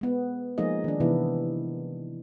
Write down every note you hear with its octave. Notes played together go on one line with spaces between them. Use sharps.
G#3 B3
F3 G#3 A#3 D#4 G#4 D#5
D#3 D4
C3 E3 B3 E4